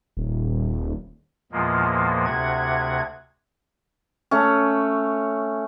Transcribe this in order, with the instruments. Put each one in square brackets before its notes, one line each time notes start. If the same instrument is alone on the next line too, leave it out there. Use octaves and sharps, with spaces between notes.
[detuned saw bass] D#1
[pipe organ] E2 A#2 F3 G#3 A#3
D2 C3 F#5 G#6
[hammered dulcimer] A3 C#4